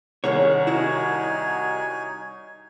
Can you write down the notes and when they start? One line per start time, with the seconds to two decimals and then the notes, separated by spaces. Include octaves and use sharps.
0.24 C2 D#3 C#4 G#4 C#5
0.67 D#4 E4 F#4 C#5 G#5